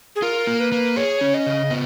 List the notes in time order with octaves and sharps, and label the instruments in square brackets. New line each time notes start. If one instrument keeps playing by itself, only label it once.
[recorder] G#4
[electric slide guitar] F4 [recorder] A#4
[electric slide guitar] A#3
[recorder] B4
[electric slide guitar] A#3
[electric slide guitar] G#4 [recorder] C#5
[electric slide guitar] C#4
[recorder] D#5
[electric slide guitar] C#3
B3